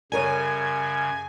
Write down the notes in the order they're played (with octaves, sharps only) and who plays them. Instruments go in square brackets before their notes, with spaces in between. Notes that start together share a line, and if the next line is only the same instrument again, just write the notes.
[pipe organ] F#2 C#3 [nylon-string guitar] G3 A#4 C#5 [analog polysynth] G#5